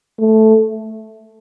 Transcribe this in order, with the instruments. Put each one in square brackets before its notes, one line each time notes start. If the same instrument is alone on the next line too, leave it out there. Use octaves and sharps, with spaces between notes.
[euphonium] A3